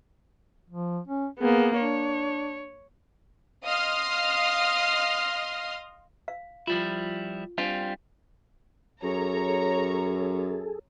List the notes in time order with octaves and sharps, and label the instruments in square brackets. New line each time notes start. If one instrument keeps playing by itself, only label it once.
[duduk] F3
C#4
[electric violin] A#3 B3 [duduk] G#4
[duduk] D4 [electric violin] C#5
[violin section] D#5 F5 C6 D#6 F6 C7
[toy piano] F5
[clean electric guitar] F3 G3 E4 [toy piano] F4
[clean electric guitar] G3 C4 F4 [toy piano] D4 F5 G#5
[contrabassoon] F#2 [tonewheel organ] G#4 A4 [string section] C#5 A#5